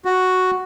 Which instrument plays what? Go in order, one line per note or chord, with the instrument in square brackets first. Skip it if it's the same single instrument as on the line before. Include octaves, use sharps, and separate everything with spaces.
[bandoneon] F#4